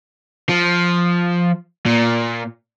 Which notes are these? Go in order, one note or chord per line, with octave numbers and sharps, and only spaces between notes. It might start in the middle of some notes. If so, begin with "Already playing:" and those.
F3
A#2